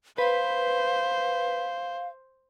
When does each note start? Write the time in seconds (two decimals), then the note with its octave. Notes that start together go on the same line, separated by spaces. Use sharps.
0.18 B4 C5 F5